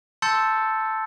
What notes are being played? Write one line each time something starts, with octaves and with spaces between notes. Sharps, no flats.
A5 C6 E6 G6 A6 C#7